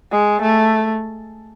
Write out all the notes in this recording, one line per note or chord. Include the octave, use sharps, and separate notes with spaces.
G#3
A3